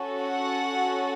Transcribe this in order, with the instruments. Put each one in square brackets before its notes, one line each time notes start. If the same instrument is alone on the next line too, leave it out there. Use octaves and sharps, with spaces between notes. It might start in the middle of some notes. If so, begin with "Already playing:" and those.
Already playing: [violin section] C#4 F#4 A4
F#5